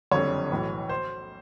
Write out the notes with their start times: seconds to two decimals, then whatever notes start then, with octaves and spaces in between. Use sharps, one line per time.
0.11 F#1 F2 D3 G3 C#5
0.51 B1 A2 E3
0.89 C5